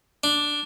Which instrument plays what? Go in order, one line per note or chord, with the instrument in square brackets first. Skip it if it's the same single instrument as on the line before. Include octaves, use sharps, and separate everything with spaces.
[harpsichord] D4